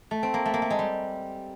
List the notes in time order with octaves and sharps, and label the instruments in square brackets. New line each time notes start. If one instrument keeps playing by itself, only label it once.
[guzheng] A3
C4
A#3
A3
A#3
A3
G#3
G3